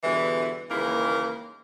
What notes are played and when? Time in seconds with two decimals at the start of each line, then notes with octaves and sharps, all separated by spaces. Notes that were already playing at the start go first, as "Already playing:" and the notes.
0.03 E2 G2 B2 D3 E3
0.70 D#2 C#3 E3 G#3 A#3